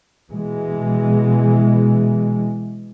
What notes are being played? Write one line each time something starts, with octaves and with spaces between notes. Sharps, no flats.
B2 E3 G#3